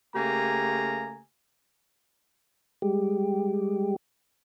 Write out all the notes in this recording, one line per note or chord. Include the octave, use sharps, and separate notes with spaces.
C#3 A3 A#3 G4 G#5 A#5
G3 G#3 G4